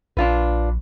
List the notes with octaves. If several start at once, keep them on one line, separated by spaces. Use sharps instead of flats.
A#1 D4 F4 B4